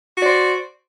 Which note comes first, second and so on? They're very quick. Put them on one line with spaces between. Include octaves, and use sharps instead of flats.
F#4 D5 C5